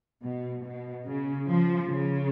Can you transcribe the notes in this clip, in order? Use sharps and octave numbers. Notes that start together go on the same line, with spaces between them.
B2
B2
C#3
F3
C#3